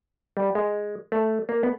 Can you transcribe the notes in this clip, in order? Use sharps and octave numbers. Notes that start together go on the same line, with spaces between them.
G3
G#3
A3
A#3
B3